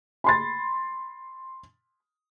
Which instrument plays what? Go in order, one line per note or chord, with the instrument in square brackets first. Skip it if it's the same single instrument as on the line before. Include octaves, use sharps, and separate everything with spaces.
[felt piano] B5 C6 A6